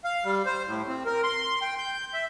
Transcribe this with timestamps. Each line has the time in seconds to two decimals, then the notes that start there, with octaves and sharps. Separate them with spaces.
0.04 F5
0.24 G3
0.46 C5
0.67 A2
0.88 C4
1.05 A#4
1.24 C6
1.61 G5
1.78 G6
2.14 E5